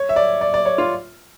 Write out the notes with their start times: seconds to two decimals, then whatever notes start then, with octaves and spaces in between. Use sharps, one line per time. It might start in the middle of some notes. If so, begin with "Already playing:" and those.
Already playing: C#5
0.09 E5
0.16 D5
0.41 D5
0.54 D5
0.66 C#5
0.78 F4